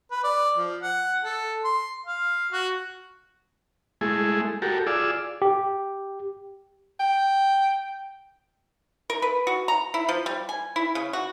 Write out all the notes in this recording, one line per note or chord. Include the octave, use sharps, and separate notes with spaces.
B4
D5
F3
F#5
A4
C6
F5
F#4
G#3 A3 E4 G#4
F#4 G4 A4 A#4
F4 G#4 D5 E6
G4
G5
A#4
B4
F#4
A#5
E4
F3
G3
G#5
E4
C#3
F#4